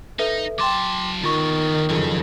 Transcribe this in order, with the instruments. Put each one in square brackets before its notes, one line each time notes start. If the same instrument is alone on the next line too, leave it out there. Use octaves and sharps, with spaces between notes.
[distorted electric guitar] D#4 [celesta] A4 B4 E5
[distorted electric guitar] F#3 A5 [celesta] G5 C6 D6
[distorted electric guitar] D#2 B3 [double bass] D#3 [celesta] F4 C#6
[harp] F#1 F2 [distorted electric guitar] C#3 C#4